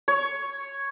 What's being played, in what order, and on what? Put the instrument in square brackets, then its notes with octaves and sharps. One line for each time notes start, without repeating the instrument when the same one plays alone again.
[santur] C#5